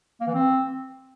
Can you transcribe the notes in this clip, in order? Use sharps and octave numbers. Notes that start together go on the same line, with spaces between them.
A#3
E3
C4